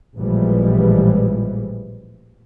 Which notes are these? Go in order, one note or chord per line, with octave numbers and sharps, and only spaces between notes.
A1 A#2 E3 F3 G3 G#3